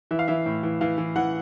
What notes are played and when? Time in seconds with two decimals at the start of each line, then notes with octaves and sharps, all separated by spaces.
0.11 E3 E5
0.19 F5
0.28 E3 E5
0.46 A2
0.63 E3
0.81 E3 F5
0.98 E3
1.16 E3 F#5